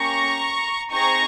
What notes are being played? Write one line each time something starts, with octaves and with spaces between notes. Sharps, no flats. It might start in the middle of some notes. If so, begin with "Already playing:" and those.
Already playing: A#3 C#4 G4 A#5 C#6
C4 D#4 G#4 A#5 C#6